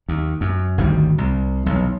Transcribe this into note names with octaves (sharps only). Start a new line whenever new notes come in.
D#2
F#2
G#1 D2 D#3 G3
C2
B1 E2